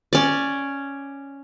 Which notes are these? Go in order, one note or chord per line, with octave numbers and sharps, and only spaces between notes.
C#4 D5